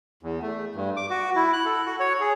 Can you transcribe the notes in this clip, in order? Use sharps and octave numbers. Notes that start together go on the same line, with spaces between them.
E2
A3
G2
D6
F#4
E4
F#6
A4
F#4
C#5
G#4